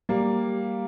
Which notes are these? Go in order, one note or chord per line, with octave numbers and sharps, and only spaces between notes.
G3 A#3